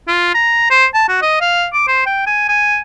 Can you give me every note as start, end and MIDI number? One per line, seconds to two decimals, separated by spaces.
0.08 0.32 65
0.35 0.71 82
0.71 0.86 72
0.94 1.06 81
1.09 1.18 66
1.22 1.39 75
1.41 1.66 77
1.73 1.87 86
1.88 2.03 72
2.06 2.23 79
2.27 2.44 80
2.49 2.79 80